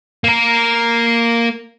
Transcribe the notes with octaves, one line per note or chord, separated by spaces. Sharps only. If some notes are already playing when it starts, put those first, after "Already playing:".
A#3 A#4